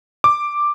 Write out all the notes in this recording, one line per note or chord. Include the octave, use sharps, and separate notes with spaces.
D6